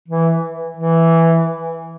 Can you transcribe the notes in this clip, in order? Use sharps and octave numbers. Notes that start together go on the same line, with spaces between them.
E3
E3